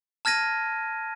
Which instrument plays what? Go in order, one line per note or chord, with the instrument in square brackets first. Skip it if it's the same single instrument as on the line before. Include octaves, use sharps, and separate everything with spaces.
[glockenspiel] A5 F6 G#6 A#6 D#7